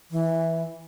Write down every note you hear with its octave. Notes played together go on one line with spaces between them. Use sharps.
E3